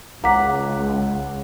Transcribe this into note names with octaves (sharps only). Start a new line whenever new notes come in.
C#2 F#5 A#5 D6 B6